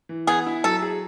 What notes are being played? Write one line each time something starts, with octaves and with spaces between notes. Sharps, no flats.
E3
B3 G#4
E4
F#3 A4
G#4